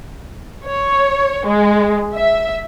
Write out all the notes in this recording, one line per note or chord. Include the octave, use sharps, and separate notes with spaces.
C#5
G#3
E5